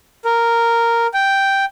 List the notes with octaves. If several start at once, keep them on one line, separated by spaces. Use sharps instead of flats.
A#4
G5